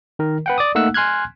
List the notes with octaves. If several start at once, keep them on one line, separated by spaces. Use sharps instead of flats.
D#3 A#4
B4 F#5 G5
D5 D6 D#6
A3 A#3 D#4 F#5 E6 F#6
G#5 C6 F6 F#6 G#6